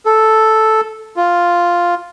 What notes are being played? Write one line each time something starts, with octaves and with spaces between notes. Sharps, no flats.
A4
F4